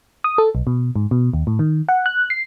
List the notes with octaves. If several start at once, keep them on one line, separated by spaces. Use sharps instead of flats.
D#6
A4
B1
B2
G#2
B2
D#2
A2
D#3
F#5
F#6
C7